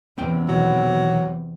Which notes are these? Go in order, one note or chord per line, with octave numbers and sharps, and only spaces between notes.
E2 C3 B3 C#4 G5
B2 D#3 E3 F#3